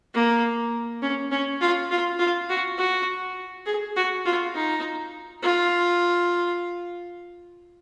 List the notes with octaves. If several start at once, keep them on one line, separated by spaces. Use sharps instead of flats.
A#3
C#4
C#4
F4
F4
F4
F#4
F#4
G#4
F#4
F4
D#4
F4